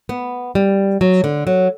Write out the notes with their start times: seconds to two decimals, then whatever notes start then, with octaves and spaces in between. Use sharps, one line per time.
0.09 B3
0.55 G3
1.01 F#3
1.24 D3
1.47 F#3